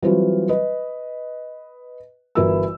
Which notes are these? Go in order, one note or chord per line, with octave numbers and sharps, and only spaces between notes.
E3 F#3 G3 C4 F4 F#4
B4 D#5
G1 E3 E4 F#4 A#4 E6